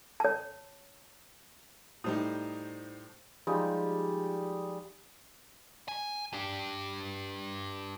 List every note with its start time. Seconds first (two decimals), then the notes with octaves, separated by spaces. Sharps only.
0.20 C#5 A5
2.04 A2 G3 D#4 C5 D#6
3.47 F3 G3 G#3 D#4
5.88 G#5
6.33 D4 G4